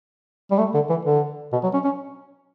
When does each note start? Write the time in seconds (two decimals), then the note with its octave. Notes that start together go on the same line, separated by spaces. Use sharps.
0.51 G3
0.58 A3
0.74 D3
0.90 E3
1.05 D3
1.53 B2
1.63 F#3
1.74 C#4
1.84 C#4